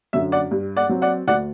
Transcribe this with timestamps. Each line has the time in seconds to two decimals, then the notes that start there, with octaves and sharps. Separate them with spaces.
0.13 F#2 D3 E5
0.32 D5 F#5
0.51 G2
0.77 D5 F#5
0.89 F#3 C4
1.02 D5 F#5
1.27 D2 D5 F#5